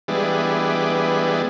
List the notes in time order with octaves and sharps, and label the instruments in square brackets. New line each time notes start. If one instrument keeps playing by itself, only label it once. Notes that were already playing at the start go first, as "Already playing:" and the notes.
[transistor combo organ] E3 G3 G#3 B3 D4